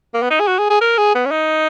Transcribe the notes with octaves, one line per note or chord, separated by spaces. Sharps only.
A#3
B3
D#4
G#4
F#4
G#4
G#4
A#4
G#4
B3
C#4
D#4